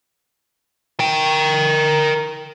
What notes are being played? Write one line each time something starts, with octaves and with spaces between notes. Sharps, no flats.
A#4 G5